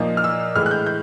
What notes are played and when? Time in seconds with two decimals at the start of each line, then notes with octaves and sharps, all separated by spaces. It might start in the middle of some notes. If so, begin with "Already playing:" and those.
Already playing: A#2 F3 A#3 D#4
0.17 F6
0.24 E6
0.55 A2 E3 G#3 F6
0.66 F#6
0.71 G6
0.86 G6